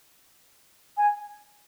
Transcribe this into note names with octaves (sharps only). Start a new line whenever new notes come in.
G#5